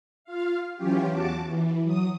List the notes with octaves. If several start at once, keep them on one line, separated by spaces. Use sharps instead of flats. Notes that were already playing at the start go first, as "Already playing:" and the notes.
F4 F5
E3 F#3 C#4 F4 G4
E2 F#4 A5 D6
E3
F#3 D#6